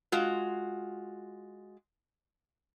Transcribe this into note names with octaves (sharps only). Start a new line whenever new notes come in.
G#3 F4 F#4